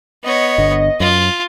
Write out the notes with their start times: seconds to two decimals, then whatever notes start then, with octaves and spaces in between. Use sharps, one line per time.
0.24 B3 C#5 D#5
0.58 G1 D3
1.00 F#2 F4